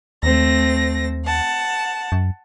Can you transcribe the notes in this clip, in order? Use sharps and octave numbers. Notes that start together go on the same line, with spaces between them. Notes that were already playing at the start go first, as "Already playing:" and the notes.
D#2 A3 C4 A#6
F#5 A5
F#2